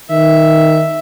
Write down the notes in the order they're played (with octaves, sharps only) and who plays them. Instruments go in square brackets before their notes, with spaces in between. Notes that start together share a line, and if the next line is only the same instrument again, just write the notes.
[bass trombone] D#3 [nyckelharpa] E5